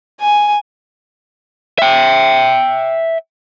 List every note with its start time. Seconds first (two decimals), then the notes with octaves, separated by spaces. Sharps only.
0.21 G#5
1.79 E5 G5